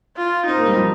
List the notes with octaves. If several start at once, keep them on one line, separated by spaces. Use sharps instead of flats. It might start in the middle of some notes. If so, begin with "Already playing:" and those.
F4
C4 D#4
A#3
G3
F3